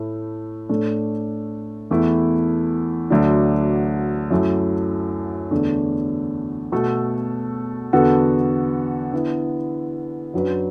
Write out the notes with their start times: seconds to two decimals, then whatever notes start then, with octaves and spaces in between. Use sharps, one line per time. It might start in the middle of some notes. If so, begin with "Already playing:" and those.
Already playing: A2 A3 E4
0.69 A2 A3 D4 A4
1.91 E2 E3 A3 E4
3.10 D2 D3 F#3 D4
4.31 F#2 F#3 A3 E4
5.51 E2 D3 A3 D4 A4
6.72 B2 A3 F#4 A4
7.93 E2 D3 B3 F#4 A4
9.13 D3 B3 E4
10.34 F#2 F#3 D4 B4